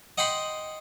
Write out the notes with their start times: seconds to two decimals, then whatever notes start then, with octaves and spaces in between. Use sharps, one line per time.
0.18 D#5 F#5 G5 B5 C6